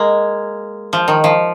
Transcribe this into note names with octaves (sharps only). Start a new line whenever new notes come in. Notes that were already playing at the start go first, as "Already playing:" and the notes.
Already playing: G#3 A#3
F3
D#3
F3